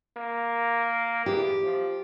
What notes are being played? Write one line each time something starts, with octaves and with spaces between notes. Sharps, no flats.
A#3
E2 G4
F3